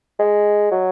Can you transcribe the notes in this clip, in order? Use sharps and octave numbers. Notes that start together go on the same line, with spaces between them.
G#3
F#3